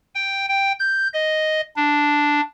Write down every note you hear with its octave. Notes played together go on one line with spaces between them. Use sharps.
G5
G5
G6
D#5
D4